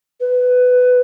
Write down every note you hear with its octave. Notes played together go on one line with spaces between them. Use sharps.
B4